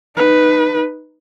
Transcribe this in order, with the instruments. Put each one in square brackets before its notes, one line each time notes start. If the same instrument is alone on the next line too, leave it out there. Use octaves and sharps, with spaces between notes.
[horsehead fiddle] D#4 B4